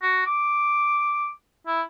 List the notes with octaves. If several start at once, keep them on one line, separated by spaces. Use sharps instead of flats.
F#4
D6
E4